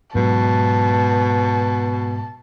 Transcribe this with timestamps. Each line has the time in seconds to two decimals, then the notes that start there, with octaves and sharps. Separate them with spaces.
0.15 G#2 B2 F#3 G#3 A5